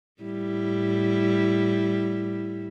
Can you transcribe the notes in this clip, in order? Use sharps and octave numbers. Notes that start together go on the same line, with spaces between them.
A2 G3 E4